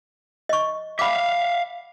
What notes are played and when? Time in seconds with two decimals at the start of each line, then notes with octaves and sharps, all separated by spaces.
0.49 D#5 C#6
0.99 E5 F5 B5 D6